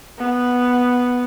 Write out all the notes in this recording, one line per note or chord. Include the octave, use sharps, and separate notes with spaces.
B3